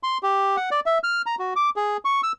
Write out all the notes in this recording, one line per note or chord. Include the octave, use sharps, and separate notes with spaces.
C6
G4
F#5
D5
E5
F6
A#5
F#4
D6
G#4
C#6
E6